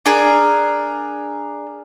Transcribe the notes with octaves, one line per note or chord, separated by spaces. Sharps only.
D4 G#4 A#4